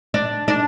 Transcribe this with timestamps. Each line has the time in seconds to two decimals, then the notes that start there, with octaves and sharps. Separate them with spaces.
0.14 D4
0.48 D4